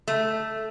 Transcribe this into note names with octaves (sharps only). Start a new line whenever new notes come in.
A3